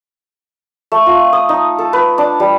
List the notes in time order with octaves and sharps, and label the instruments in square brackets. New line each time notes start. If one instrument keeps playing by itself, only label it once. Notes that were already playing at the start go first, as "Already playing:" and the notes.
[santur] A3
F4
D#6
D#4
A4
B4
D4
G3